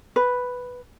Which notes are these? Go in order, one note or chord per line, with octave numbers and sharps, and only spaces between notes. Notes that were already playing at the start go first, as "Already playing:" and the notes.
B4